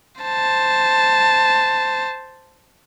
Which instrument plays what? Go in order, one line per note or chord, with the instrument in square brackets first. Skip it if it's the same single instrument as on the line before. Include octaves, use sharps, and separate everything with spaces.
[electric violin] C5 A5